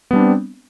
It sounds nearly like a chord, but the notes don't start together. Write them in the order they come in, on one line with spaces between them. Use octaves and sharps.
B3 G3 D4 C4